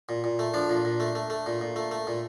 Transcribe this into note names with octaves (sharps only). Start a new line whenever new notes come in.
A#2
A#2
A3
F3 D4
A#2
A#2
A3
A3
A3
A#2
A#2
A3
A3
A#2